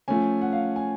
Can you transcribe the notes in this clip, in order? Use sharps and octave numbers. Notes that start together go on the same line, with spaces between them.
F3 A3 C#4 G#5
F#5
F5
G#5